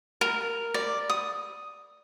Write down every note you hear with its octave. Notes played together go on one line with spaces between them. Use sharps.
A#4
D5
D#6